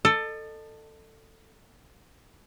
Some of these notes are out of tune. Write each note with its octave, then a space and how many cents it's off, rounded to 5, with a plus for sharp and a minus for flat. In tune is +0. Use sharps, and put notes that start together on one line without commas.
A4 +15 D#5 -35